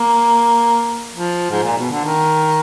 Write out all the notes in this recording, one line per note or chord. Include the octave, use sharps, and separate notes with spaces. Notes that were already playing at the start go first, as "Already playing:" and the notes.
Already playing: A#3
F3
G#2
A#2
B2
D3
D#3